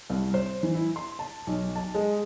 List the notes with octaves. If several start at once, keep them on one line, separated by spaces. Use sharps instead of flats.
C2
C5
E3
E4
C6
A5
B1
A5
G#3